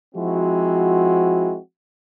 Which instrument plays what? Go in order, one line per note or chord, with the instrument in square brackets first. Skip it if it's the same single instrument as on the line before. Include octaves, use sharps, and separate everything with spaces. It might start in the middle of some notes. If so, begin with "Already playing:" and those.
[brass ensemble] F3 G#3 C4 E4 F#4